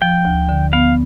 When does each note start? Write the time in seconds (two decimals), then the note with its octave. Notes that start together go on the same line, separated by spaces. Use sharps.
0.01 F3 G5
0.25 D2
0.49 D3
0.73 B3 F5